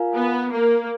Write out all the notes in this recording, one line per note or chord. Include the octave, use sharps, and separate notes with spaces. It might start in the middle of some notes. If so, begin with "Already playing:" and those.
Already playing: F4 A#4 F5 G#5
B3
A#3